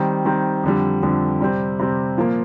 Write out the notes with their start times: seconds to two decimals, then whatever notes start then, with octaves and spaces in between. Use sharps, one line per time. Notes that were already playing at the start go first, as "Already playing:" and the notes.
Already playing: D#3 G3 C4
0.25 D#3 G3 C4
0.63 F2 D3 G3
1.03 F2 D3 G3
1.40 C3 G3 C4
1.79 C3 G3 C4
2.18 A#2 F3 A#3